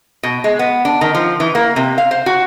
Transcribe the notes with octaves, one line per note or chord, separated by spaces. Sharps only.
B2
G#3
B3
D4
D#3
F3
E3
A#3
C3
F5
C5
F#4